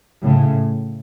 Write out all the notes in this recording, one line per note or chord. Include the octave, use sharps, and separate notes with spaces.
A2 C#3